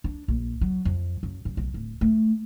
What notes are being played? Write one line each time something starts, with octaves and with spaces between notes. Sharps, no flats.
D4
A#1
F#3
F2
F#2
F#2
B1
D1
A3